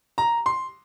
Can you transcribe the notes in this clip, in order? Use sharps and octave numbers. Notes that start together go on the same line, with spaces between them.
A#5
C6